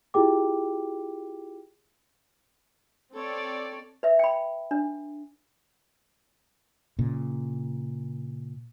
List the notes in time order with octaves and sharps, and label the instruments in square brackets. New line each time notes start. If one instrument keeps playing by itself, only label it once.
[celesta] E4 F4 G4 G#4 G5 D6
[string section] C4 D5 [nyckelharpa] A4 C#5
[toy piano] B4 E5
G5 B5
D4
[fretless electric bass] A#2 C#3